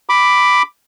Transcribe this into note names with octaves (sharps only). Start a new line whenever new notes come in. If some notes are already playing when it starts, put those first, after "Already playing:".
B5 D6